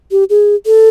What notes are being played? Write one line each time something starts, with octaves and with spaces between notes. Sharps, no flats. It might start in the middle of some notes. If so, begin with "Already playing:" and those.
G4
G#4
A4